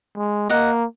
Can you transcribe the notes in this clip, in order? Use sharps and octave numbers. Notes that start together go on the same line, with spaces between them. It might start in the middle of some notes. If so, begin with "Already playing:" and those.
G#3
A#3 D#5 F#5